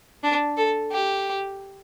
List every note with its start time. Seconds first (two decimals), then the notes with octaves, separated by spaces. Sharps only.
0.23 D4
0.57 A4
0.92 G4